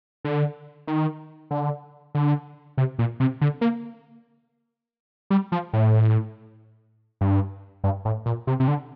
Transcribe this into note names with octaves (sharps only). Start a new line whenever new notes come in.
D3
D#3
D3
D3
C3
A#2
C3
D3
A#3
G3
F3
A2
G2
G2
A2
A#2
C3
C3
D3